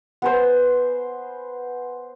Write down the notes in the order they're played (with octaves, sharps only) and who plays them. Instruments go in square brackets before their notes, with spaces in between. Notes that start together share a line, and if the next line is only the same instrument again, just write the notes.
[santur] B3 G#4 C5